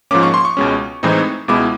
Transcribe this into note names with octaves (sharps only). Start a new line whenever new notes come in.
G#2 F3 A#3 C#4 D6
C#6
C6
C#6
C#2 B2 G#3 C#4
A2 E3 G#3 C4 D#4
C#2 B2 G#3 B3 E4 D6